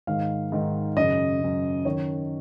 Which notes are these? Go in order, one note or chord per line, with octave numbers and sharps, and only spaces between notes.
G#2 D#3 F5
G#2 D#3
F#2 C#3 D#5
F#2 C#3
F#2 D#3 C#5